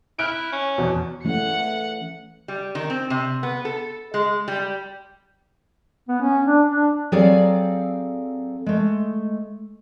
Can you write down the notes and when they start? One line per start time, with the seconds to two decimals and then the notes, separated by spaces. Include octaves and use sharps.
0.19 E4 F6 F#6 D7
0.52 C#4
0.78 E2 B2
1.25 E3 A3 C#4 F#5 C#7
2.48 G3
2.75 D#3
2.90 C4
3.10 C3
3.43 B3
3.65 A4
4.14 G#3
4.48 G3
6.09 B3
6.21 C#4
6.46 D4
6.69 D4
7.12 F#3 C4 G#4 A4 D5 F5
8.66 G#3 A3